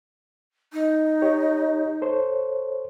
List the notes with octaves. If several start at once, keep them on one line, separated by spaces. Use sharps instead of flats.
D#4
G4 C#5
A4 C5 C#5